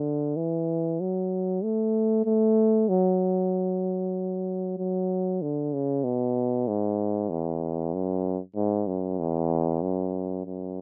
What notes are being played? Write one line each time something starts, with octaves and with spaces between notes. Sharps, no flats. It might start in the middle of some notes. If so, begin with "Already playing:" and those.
Already playing: D3
E3
F#3
A3
A3
F#3
F#3
D3
C#3
B2
G#2
E2
F#2
G#2
F#2
E2
F#2
F#2